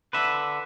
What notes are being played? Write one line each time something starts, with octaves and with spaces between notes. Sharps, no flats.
D3 B4 E5